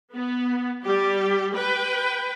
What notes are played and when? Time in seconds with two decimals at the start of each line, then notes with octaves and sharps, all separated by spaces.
0.13 B3
0.82 G3 G4
1.53 B4 G5